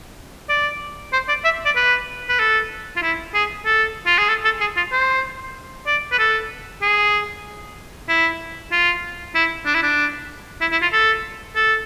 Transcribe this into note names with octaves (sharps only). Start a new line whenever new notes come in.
D5
C5
D5
E5
D5
B4
B4
A4
F4
E4
G#4
A4
F4
G#4
A4
A4
G#4
F4
C5
D5
B4
A4
G#4
E4
F4
E4
D4
E4
D4
E4
E4
F4
A4
A4